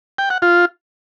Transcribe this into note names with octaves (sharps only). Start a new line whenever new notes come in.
G5
F#5
F4